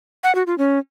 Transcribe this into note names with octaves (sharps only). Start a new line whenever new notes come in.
F#5
F#4
F4
C#4